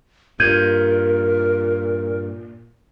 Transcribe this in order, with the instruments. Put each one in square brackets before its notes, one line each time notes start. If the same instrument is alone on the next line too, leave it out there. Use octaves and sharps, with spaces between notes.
[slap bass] G2 [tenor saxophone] A#2 [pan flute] A#4 [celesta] G6 G#6 D#7